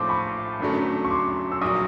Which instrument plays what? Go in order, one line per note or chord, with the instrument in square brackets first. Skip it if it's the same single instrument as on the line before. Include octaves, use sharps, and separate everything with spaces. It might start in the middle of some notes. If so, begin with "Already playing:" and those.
Already playing: [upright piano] A#1 A2 F3 A3 C4 [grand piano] C6 D6
[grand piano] B5 C#6
[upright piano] G#1 F#2 D3 F#3 A3
[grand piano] C#6
C6 D6
E6
[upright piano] A#1 A#2 F#3 [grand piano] C#6 D#6